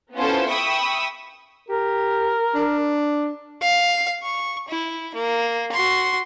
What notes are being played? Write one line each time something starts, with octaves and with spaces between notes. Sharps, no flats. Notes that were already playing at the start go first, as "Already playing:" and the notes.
B3 C#4 E4 F4 A4 C5
E5 G5 B5 C#6 D#6 E6
G4 A#4
D4
F5
C#6
E4
A#3
F#4 C6